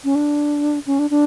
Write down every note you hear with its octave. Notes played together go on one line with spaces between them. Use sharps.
C#4
D4
C#4
D4
D4